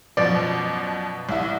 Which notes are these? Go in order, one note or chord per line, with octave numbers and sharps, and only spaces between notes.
F#2 B2 F3 D5
C2 E4 E5